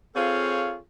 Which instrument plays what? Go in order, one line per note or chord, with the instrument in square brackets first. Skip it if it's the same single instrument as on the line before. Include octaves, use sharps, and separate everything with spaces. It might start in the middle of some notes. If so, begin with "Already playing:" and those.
[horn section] C4 F4 G#4 A4 C#5 F5